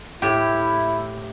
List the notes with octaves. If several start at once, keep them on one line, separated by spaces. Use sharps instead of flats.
A2 E4 G4